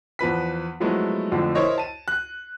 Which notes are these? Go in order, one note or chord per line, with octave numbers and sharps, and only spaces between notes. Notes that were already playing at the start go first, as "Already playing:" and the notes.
E2 F3 B4 B6
F3 F#3 G#3 A3 B3 E4
F2 A2 D3 F3
E4 A#4 C5 C#5 D#5
A5 D#7
F#6